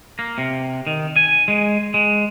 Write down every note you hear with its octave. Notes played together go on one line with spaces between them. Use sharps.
A#3
C3
D#3
G#5
G#3
G#3